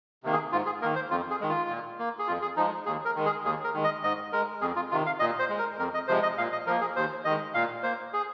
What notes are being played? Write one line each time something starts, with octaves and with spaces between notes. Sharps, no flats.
C3 D#3 A#3
G#4
G#2 F4
G#4
D#3 A#3 A#4
C5
F2 F4
G#4
D#3 G#3
F4
A#2
A#3
G#4
F2 F4
G#4
F3 G#3 D#4
D#2 G#4
A#4
D#3 G#3
G#4
D#2 G#4
A#4
D#3 G#3
D#5
G#2 D#5
G#3 A#4
F2 G#4
F4
C3 D#3 F4
F5
A#2 D#5
C5
G#3
A#4
F2 A#4
D#5
C3 F3 G#3 C5
D#5
A#2 F5
D#5
F3 A#3 A#4
G#4
D#2 C5
D#3 G#3 D#5
A#2 F5
A#3 C5
G#4